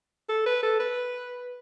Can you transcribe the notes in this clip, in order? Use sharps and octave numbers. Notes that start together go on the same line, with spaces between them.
A4
B4
A4
B4